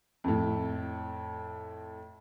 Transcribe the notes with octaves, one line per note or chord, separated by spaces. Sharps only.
F2 A2